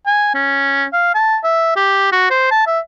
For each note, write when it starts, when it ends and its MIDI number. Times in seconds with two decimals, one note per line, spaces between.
0.06 0.33 80
0.34 0.85 61
0.93 1.13 77
1.15 1.38 81
1.44 1.74 76
1.76 2.08 67
2.12 2.28 66
2.31 2.50 72
2.51 2.65 81
2.67 2.80 76